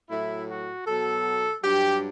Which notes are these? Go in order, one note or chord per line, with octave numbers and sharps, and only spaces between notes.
A2 F#3 E4
F#4
B2 F#3 A4
G2 F#3 G4